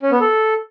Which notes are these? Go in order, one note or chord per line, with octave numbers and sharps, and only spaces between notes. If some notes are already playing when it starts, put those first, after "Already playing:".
C#4
B3
A4